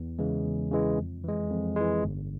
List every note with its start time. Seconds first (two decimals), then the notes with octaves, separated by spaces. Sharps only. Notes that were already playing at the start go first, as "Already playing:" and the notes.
Already playing: E2
0.19 C#3 E3 G#3
0.45 E2
0.71 C#3 E3 G#3
0.98 F2
1.24 E3 G#3
1.50 F2
1.76 E3 G#3
2.03 G1